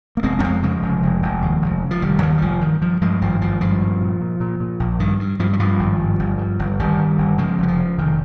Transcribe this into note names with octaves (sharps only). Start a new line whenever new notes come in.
A#3
F1 G#3 C4
C#4
F2 G#3 C4
C#3 F3 G#3
F1
F1
F1
D#2
F1
C#3
F3
F1 D#3 G3
D#2 D#3 G3
G3
F1 F3
G2 D#3
G2 F3
G2 F3 G#3
G#1 F3
G#1 F3
G2 F3
A#2
A#2
A#2
A#2
A#2
A#1
G2 D#3
G2
G2 F3
G3
G2 F3
G#1
G2
G1
G2
G1
G1 D#3 G3
G2
G1
C#3 F3 G#3
F1
G3
F3
C#3
F1 D#3